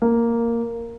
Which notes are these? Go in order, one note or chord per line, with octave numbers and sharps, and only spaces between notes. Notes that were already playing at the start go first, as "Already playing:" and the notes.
A#3